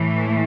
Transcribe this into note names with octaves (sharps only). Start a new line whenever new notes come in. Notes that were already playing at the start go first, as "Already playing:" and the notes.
Already playing: A2 E3 A3